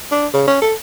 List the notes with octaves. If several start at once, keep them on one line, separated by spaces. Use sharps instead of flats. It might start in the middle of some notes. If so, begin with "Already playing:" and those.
D4
C#3
C#4
A4